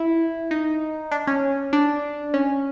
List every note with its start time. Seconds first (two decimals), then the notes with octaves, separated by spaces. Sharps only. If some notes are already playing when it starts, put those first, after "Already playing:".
Already playing: E4
0.51 D#4
1.12 D4
1.27 C#4
1.73 D4
2.34 C#4